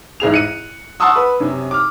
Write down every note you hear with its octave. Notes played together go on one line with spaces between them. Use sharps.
A1 G#2 G#4 F7
F#6 C#7 D#7
F#5 A5 C6 C#6 D#6 E6
B4
F#2 C3 C#4
D6 F6